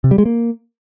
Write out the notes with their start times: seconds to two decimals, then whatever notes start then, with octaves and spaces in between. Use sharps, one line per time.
0.04 C3
0.11 G3
0.18 G#3
0.25 A#3